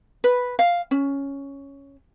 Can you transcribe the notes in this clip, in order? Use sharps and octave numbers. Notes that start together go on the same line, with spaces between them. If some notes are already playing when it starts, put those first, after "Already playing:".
B4
F5
C#4